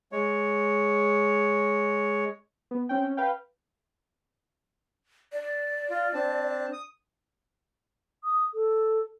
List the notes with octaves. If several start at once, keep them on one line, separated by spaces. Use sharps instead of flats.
G#3 C#5
B3
C4 C#4 G5
C#4
B4 F5 G5
D5
F4
C4 D4 A5
D#6
D#6
A4